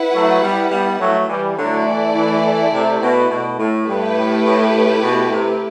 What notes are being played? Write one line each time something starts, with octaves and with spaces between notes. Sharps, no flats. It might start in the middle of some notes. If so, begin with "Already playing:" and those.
Already playing: E4 B4 F#5
F#3 A3
G3 B3
G3 B3
F#3 A3
E3 G3
D3 F#3 A3 E4 A4 D5
E3
E3
C3
B2
B2
A2
G2 A3 E4 G4 B4
A2
A2
A2
B2
C3